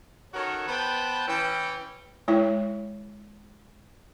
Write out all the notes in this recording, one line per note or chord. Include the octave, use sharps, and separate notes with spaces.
D#3 C#4 F#4 A4 A#4 C#5
B3 B4 C5 G5 A5
E3 C#4 G5
G#3 E4 C#5 G5